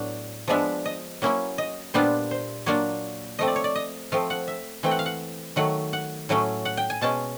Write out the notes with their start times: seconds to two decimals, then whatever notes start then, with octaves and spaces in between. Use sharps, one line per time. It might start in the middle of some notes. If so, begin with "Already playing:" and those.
Already playing: A2 F#3 B3 D4
0.48 F3 G#3 B3 D4 E5
0.86 D#5
1.22 F#3 A#3 C#4 E4
1.58 D#5
1.94 A#2 G3 B3 D4 F4 C5
2.31 C5
2.66 F#3 A#3 D4 F4 C#5
3.39 F3 A3 C4 D#5
3.47 D5
3.56 C#5
3.64 D5
3.75 D#5
4.12 F3 A3 C4 F5
4.30 F#5
4.48 E5
4.83 E3 A3 C4 G5
4.91 F#5
4.99 F5
5.06 F#5
5.56 D#3 F#3 A3 F#5
5.93 F#5
6.29 A2 F#3 A3 C#4
6.65 F#5
6.77 G5
6.90 G#5
7.01 B2 G#3 C#4 A5